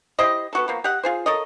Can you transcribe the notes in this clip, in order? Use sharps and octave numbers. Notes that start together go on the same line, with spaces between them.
E4 G4 C5 D#5
B3 F#4 A4
F3 A#3 B3
G4 D#5 F#5
F4 G#4 C5
A4 A#4 C#5 D#5